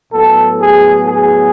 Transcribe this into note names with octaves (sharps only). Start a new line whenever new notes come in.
A2 F#3 B3 A4
G#4
G#4